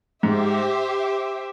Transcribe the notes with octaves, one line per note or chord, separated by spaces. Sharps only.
G#2 G4 C5 E5